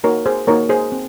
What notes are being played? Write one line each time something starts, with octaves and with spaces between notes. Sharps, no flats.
A#3 D#4 F#4 A#4 C#5
G#4 C5
A#3 D#4 F#4 A#4 C#5
G#4 C5
C4